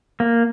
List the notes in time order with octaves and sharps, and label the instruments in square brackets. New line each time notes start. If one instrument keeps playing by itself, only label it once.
[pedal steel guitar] A#3